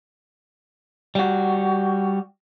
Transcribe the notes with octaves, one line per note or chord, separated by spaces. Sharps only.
G3 F#4